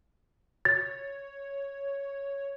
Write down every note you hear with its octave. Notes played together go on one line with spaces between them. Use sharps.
C#5 A6